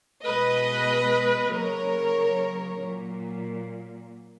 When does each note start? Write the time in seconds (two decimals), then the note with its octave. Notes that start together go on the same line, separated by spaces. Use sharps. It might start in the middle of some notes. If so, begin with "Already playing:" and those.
0.23 B2 G#3 B4 D#5
1.51 C#3 F#3 A#3 A#4 C#5
2.79 A#2 F#3 A#3